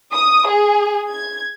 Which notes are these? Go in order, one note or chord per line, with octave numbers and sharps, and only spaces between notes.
D#6
G#4
G#6